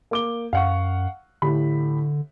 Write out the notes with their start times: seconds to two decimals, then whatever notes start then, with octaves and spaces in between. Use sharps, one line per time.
0.11 A#3 D6 G7
0.53 F#2 F5 F#5 C#6
1.42 A2 D3 G4 B5